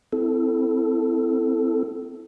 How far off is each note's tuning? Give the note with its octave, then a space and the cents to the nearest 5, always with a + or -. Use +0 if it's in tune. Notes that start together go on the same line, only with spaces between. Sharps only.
C4 -25 E4 +0 A4 +0